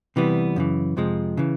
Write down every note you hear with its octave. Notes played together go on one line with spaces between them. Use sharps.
C3 E3 G3 B3
F#2 C#3 E3
F2 C3 F3 G#3
C#3 E3